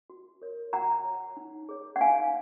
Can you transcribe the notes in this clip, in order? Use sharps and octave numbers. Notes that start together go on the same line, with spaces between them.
F#4
A#4 C#5
F#4 F#5 A#5
C#5
D#4
G#4 C#5
F#5
D#4 F5 G#5